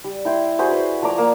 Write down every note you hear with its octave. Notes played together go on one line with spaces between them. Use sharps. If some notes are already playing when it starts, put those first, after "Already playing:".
G3
E4 G5 C6
F#4 G#4 C5 B5
B4
F3 D5 A#5 D6
A#3